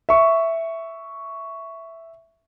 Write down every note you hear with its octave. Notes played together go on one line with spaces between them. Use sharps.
E5 C#6